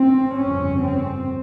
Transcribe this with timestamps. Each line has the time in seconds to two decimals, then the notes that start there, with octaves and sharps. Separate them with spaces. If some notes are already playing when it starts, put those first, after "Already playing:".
Already playing: C4
0.36 G1 F2 C#3 C#4
0.80 C4